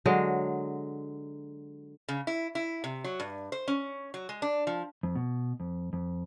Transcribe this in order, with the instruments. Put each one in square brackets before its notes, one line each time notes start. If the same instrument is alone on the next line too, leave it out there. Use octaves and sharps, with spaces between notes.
[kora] D3 F#3 G#3
[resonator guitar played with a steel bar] C#3
E4
E4
C3
F#3
G2
C5
C#4
F#3
G#3
D4
F3
[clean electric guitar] F2
B2
F2
F2